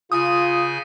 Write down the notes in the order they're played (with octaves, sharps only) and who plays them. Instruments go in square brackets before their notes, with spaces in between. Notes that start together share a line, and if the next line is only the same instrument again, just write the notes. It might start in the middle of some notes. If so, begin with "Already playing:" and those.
[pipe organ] C#3 G#5 G6 [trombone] F4 [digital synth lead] D#6